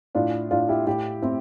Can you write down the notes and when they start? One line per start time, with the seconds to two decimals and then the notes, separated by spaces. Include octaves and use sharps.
0.15 A2 D4 F4
0.51 A2 D4 F4
0.69 E4 G4
0.87 A2 E4 G4
1.22 A2 C4 E4